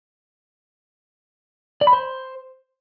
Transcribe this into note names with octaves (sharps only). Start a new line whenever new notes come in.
D5
B5
C5